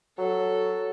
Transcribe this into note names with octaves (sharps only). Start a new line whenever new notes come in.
F#3 A4